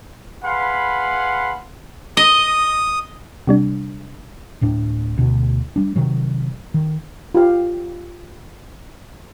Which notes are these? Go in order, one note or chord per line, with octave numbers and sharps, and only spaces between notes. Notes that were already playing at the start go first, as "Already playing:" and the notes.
G#4 B4 F5 F#5 B5 C6
D#5 D#6
C3 G3 D4
D1 A2 D4
D2 B2
G3 D4
C3 D#3 F#3
D#3
F4 G4 F5